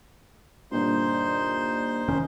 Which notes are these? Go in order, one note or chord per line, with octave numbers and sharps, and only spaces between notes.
G2 A#2 D3 D#4 C5 C6
F1 D#3 C#4